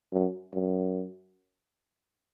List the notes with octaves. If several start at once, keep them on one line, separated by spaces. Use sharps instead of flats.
F#2
F#2